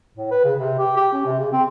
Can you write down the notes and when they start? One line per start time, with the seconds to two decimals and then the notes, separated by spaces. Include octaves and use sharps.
0.17 A2
0.31 B4
0.45 C#3
0.59 C3
0.79 G4
0.97 G4
1.13 C#4
1.26 C3
1.39 C#3
1.52 C4